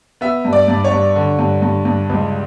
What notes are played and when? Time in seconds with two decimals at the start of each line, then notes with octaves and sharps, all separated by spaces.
0.21 B3 E5
0.45 G2
0.53 D5
0.68 G2
0.84 C#5
0.92 G2
1.15 D3
1.39 G2
1.62 G2
1.85 G2
2.10 C#2